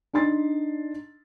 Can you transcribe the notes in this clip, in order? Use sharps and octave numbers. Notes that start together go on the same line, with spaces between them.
D4 D#4 C6 A6